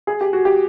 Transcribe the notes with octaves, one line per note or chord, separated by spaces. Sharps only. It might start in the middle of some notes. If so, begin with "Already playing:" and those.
G#4
G4
F#4
G4